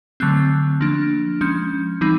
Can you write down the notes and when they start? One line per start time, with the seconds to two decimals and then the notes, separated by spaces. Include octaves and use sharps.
0.20 D3 F#3 A3 C4 F#6
0.80 F3 A#3 D4
1.41 F3 G#3 C#4 G6
2.01 E3 G3 C4 D#4